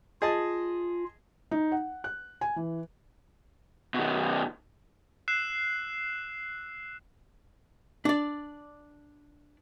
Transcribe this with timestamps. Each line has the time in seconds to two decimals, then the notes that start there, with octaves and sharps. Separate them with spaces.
0.22 F4 G#4 D#5 A5
1.51 D#4
1.72 F#5
2.04 F#6
2.41 G#5
2.56 E3
3.94 B2 D#3
5.28 E6 F#6 C7 E7
8.05 D4 D5